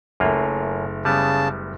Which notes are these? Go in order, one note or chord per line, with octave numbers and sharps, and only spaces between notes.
F#1 F#2 A3 A#3 F4
C#3 G3 B3 A5